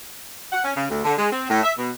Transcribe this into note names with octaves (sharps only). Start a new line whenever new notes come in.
F#5
C#4
C#3
D2
D3
G#3
C4
A2
E5
B2